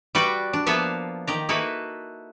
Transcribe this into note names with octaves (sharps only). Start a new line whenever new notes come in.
G3 F#4 B4 D5 G5
D4
F3 A#3 B3 F4 E5 F5
D#3 G4 A#5
A#3 D#4 E4 F#4 A4 B4